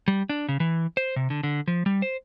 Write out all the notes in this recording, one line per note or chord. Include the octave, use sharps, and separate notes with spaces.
G3
D4
C#3
E3
C5
C3
D3
D3
F3
G3
C5